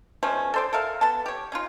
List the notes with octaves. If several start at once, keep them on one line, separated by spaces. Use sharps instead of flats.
B2 F3 A3 C#4
A4 C5 D5
A4 A#4 E5 F5
B3 A4 A5
G4 C#5
C#4 D#4 F4